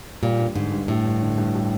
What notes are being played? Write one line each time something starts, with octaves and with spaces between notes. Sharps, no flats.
A#2 G3
G2
G#2 D3
G2
A2 G3
G2
D3
G2
G3